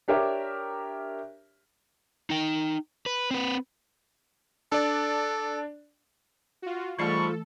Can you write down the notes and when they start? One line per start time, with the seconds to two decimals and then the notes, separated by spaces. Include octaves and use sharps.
0.08 D4 G4 A#4 C#5 E5
2.30 D#4 G5
3.06 B4
3.31 C4 B4
4.72 D4 A4 D5
6.62 F4 F#4
6.99 G#2 E3 G3 A3 F4 A4 C#6